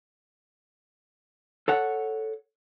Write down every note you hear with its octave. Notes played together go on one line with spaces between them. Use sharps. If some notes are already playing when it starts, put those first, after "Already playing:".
A4 C#5 F#5